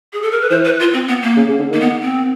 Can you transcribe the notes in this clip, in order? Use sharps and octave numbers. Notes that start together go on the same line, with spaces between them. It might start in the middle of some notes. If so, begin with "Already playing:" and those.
G#4
A4
A#4
B4
E3 C5
B4
F4
C4
B3
A#3
C#3
C#3
D3
D#3 A#3
B3
C4